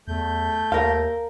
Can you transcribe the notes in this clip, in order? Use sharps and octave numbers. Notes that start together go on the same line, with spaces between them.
E2 A3 G6
D#2 A#4 F5